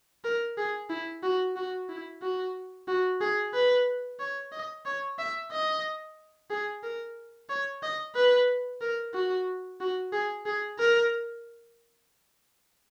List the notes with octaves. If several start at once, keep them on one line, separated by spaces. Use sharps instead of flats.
A#4
G#4
E4
F#4
F#4
E4
F#4
F#4
G#4
B4
C#5
D#5
C#5
E5
D#5
G#4
A#4
C#5
D#5
B4
A#4
F#4
F#4
G#4
G#4
A#4